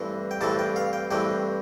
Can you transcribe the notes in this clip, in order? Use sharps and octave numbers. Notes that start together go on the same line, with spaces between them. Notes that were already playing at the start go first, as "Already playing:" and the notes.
Already playing: G2 E3 A3 C4
G5
G2 E3 A3 C4 A5
G5
F5
G5
G2 E3 A3 C4 G5